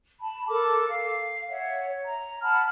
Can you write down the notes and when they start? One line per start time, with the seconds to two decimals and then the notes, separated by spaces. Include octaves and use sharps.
0.22 A5 B5
0.49 A4 A#4 D6
0.89 F5
1.50 C#5 E5 F#5
2.06 A#5
2.43 F#5 A5 B5 F6